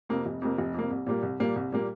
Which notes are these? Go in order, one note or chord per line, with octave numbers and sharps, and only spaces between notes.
F2 C3 A#3
F1
F2 C3 A#3
F1
F2 C3 A#3
C2
A#2 G3 A#3
C2
A#2 G3 A#3
C2
A#2 G3 A#3